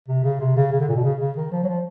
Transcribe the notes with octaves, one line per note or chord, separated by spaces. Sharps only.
C3
C#3
C3
C#3
C#3
D3
A#2
B2
C#3
C#3
D#3
F3
F#3
F3